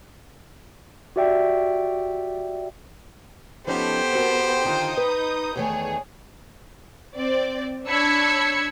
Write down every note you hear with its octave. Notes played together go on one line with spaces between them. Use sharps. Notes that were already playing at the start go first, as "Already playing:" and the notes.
F#4 G4 D5 E5 G5
F3 B3 C#4 D#4 G4 A4 C5 G5
C4 F#4 A#4
D3 D#3 D#4 F4 D#6 G6
B4
E2 D#3 A3 G#4 C#5
C4 D5
D4 C#5 B5 E6 G#6 C#7